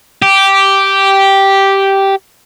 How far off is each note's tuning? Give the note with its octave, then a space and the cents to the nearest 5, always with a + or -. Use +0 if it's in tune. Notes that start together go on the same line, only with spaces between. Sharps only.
G4 -5